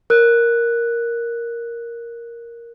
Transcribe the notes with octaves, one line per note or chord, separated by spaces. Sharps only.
A#4 F#6